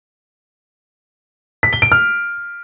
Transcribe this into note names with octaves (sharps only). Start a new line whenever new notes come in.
B6
G7
D7
F6